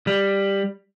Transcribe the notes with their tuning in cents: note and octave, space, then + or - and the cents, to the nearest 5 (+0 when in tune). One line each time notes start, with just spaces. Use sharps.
G3 +10